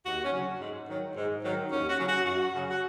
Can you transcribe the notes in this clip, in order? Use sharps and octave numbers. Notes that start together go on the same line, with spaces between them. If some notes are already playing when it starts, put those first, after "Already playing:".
D#2 F#4
C#4
C#3 F#3
G#2
D#3 F#3
G#2
D#3 F#3
D#2 C#4
F#4
C#3 F#3
F#4
F#2 F#4
C#3 F#3
F#4